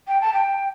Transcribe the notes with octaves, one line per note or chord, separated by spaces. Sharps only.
G5
A5
G5